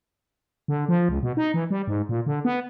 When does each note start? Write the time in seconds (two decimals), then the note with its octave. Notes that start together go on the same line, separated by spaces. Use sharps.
0.68 D3
0.89 F3
1.09 C#2
1.23 B2
1.37 D#4
1.54 E3
1.71 G3
1.87 G#2
2.09 A#2
2.26 D3
2.45 B3